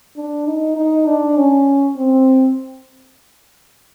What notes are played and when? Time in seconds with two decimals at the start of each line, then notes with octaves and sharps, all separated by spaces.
0.17 D4
0.47 D#4
0.76 D#4
1.07 D4
1.36 C#4
1.97 C4